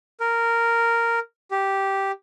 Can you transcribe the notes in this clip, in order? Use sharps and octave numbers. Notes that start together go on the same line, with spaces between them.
A#4
G4